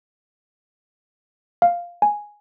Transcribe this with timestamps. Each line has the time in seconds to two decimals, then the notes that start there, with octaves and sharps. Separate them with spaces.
1.62 F5
2.02 G#5